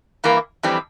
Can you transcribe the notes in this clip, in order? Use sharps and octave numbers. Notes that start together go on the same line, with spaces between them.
G2 E3 A#3
F2 E3 G3 C4